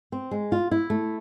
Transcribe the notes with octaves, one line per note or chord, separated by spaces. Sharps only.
C4
G#3
F4
E4
A3